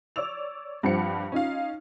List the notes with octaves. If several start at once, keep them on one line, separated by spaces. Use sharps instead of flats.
C#5 D5 D6 E6 F7
G2 F3 G3 C4 F#5 C#7
C#4 D#4 F4 F5